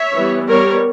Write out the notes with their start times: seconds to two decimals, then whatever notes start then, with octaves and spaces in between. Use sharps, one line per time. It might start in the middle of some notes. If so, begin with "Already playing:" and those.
Already playing: C#5 E5
0.14 E3 G3 B3
0.48 G3 B3 A#4 C#5